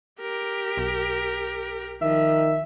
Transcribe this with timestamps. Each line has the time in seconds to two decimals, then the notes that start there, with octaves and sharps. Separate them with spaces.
0.20 G4 A#4
0.77 B1
2.02 D#3 F3 E5